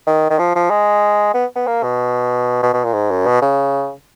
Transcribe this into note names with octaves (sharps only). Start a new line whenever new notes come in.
D#3
D#3
F3
F3
G#3
B3
B3
A#3
B2
B2
B2
A#2
G#2
F#2
B2
C#3